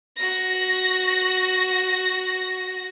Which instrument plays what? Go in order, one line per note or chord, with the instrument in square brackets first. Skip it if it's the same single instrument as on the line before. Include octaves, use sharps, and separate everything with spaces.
[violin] F#4 A#6